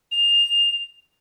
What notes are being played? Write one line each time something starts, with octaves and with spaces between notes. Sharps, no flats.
F7